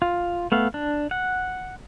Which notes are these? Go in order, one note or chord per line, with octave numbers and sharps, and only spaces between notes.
F4
A3 B3 F5
D4
F#5